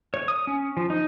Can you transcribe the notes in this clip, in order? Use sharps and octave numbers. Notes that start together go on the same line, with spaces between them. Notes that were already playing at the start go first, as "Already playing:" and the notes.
C#5
D#6
C#4
F3
D#4